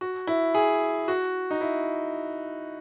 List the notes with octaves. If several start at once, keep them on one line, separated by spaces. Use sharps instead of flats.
F#4
E4
G#4
F#4
D#4
E4